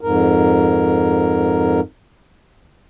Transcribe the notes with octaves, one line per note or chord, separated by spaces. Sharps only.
F2 G#2 A#4